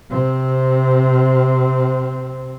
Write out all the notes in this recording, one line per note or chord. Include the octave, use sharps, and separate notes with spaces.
C3 C4